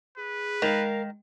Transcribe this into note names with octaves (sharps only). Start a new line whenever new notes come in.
G#4 B4
D#3 G#3 A#4 F5